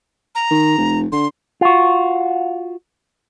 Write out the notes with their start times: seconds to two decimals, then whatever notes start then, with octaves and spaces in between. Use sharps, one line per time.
0.35 A#5
0.51 D#3
0.78 F1
1.12 D3 C6
1.61 F4 F#4